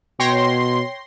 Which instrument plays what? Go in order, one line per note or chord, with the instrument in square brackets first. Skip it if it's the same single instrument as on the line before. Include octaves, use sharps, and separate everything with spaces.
[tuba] B2 [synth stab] C#5 G5 A#6 [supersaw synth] C6